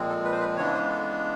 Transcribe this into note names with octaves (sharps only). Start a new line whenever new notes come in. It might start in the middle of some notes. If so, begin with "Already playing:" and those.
Already playing: A#2 F3 G#3 C4
A4
B4
C5
B4
C#3 E3 G#3 B3 D4 C#5
C5
A4